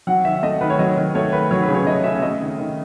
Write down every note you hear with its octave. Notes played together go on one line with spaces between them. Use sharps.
F#3 F#5
D#3 E5
A3 D#5
D#3 B4
C#5
F#3 D#5
D#3
A3 C#5
D#3 B4
F#3 C#5
B4
C#3
C#5
A3 D#5
C#3 E5
A3 D#5
D#3
D#3